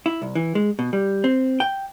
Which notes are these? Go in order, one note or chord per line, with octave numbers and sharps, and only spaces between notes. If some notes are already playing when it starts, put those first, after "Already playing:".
E4
C2
E3
G#3
B2
G3
C4
G5